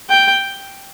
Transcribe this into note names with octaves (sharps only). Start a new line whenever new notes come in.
G5